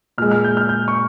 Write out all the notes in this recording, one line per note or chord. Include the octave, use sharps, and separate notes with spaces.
A#2 G#3 F6
F6
G6
F6
G6
C#6